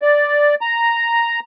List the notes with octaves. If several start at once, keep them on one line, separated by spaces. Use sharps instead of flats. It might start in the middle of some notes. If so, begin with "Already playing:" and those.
D5
A#5